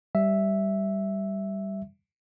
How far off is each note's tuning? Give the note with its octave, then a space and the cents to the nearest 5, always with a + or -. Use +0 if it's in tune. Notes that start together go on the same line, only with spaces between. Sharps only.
G3 +0 E5 +0